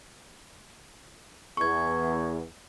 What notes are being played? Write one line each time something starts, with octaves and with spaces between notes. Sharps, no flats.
E2 C#6 G#6